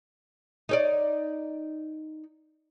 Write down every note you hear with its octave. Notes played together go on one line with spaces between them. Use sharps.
D#4 C#5 D5